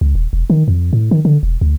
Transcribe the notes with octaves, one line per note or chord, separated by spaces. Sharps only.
C#2
D#1
E1
D#3
F2
A2
D#3
D3
E1
D2